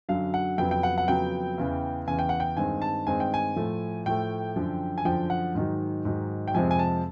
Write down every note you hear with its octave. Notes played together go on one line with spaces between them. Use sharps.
F#2 D3 F#3 F5
F#5
F2 C#3 F#3 B3 G5
G5
F#5
F#5
F2 C#3 F#3 B3 G5
E2 C#3 E3
E2 C#3 E3 G#5
G5
F#5
G5
G2 D#3 G#3 C4 G#5
A5
G2 D#3 G#3 C4 G#5
G5
G#5
A2 F3 A3
A2 F3 A3 G5
F#2 D3 F3
G#5
F#2 D3 F3 G5
F#5
G#2 D#3 F#3
G#2 D#3 F#3
G5
F2 C3 F3 G#3 C4 G#5
G#5
A5